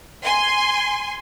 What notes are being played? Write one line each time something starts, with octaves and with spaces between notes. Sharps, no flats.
G#5 C6